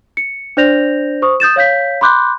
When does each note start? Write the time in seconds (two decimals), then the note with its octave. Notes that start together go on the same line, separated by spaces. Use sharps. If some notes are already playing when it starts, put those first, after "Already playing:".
0.17 C#7
0.57 D4 C5 D5 G6 A#6 F7
1.22 C5 C#6 D#6
1.40 D#6 G6 A6 E7
1.56 C#5 F5 G6 B6
2.01 B5 C6 D6 F#6 G6